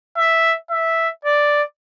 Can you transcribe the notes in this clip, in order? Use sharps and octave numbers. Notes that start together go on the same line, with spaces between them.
E5
E5
D5